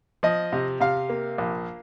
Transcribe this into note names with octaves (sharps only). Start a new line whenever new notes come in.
F3 D#5
C3
C3 F5
A#3
A#1